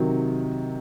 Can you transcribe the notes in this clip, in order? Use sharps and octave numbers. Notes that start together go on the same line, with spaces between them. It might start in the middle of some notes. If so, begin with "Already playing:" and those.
Already playing: C3 D#3 F#3